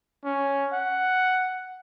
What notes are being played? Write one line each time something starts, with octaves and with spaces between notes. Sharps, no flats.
C#4
F#5